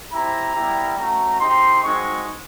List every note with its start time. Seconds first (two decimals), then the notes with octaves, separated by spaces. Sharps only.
0.12 C4 E4 G4 A#5
0.54 G3 B3 E4 G4
0.97 A3 C#4 F#4 A#5
1.40 C4 D#4 G4 C6
1.83 G#3 C4 D#4 F#4 C#6